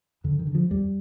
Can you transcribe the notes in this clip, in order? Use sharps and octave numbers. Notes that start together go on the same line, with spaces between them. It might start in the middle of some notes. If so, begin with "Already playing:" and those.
F2 D3
D#3
D3
F3
F2 G3